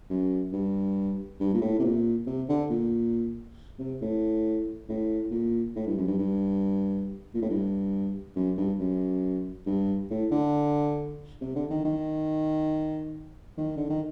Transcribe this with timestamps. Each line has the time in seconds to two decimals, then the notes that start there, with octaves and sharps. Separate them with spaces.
0.10 F#2
0.52 G2
1.40 G2
1.54 A#2
1.61 A2
1.79 C3
1.84 A#2
2.27 C3
2.49 D3
2.70 A#2
3.79 C3
4.01 A2
4.89 A2
5.31 A#2
5.76 A2
5.86 G2
5.97 F#2
6.07 G2
6.18 G2
7.34 A#2
7.42 A2
7.49 G2
8.36 F#2
8.57 G2
8.79 F#2
9.66 G2
10.11 A2
10.31 D3
11.41 C3
11.55 D3
11.70 D#3
11.85 D#3
13.58 D#3
13.77 D3
13.90 D#3